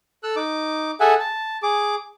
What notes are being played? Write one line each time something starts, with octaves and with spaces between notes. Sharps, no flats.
A4 E6 F#6
D#4 D6
G#4 A4 E5 F#5 G#5
A5
G#4 D6